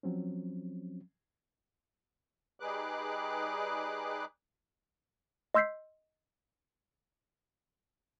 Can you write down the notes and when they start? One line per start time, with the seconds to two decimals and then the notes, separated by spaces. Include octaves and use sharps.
0.03 F3 F#3 C4 C#4
2.60 G3 D#4 G#4 B4 D6 F#6
5.55 D#5 C6 E6 G6 B6 C7